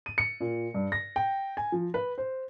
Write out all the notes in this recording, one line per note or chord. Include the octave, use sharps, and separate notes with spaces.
D#7
C#7
A#2
G2
A#6
G5
G#5
F3
B4
C5